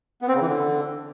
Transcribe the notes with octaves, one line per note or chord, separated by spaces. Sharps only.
B3
C4
C#3
E3
D3